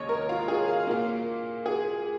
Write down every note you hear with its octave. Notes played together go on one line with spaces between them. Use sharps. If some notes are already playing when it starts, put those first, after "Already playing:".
Already playing: D#2 C#3 G#3 C#5 D#5
A#4
F4
G#4
F5
A#2 A#3 F5
G#4